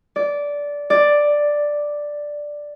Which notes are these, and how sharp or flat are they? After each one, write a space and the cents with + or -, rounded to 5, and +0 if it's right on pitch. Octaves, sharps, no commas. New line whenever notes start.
D5 -15
D5 +5